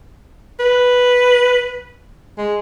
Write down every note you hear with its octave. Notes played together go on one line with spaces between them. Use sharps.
B4
G#3